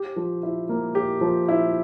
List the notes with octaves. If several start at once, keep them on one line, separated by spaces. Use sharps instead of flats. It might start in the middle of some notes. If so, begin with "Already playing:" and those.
Already playing: G4
F3
E4
A#3
G4
F3
E4